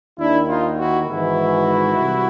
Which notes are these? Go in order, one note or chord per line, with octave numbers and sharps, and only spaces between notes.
D#2 D#3 D4 E4
D#4 F4
E4 F#4
G#1 G#2 E3 E4 F#4
C2